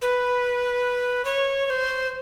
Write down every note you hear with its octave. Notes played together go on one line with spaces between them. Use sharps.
B4
C#5
C#5
C5